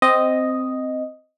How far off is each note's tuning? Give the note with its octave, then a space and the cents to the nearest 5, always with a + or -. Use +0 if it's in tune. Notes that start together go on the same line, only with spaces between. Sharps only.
C4 -10 D#5 +0